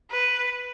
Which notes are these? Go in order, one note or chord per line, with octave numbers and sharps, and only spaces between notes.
B4